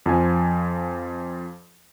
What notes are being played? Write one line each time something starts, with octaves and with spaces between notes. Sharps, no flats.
F2 F3 G#5